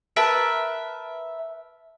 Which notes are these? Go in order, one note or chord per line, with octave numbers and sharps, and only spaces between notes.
A#4 B4 E5 A5